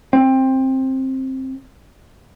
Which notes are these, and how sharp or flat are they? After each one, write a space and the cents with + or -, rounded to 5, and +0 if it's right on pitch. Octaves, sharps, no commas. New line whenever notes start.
C4 +15